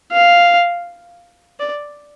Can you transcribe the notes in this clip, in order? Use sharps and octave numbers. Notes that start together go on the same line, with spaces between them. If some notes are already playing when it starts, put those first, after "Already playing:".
F5
D5